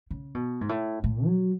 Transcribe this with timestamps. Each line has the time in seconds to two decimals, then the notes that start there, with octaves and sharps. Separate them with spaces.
0.11 C#3
0.35 B2
0.61 G#2
0.69 A2
1.04 A2
1.26 F#3